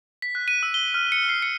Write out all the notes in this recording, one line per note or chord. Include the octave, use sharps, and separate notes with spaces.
B6
F#6
D#7
E6
G7
F6
C#7
C7
C#7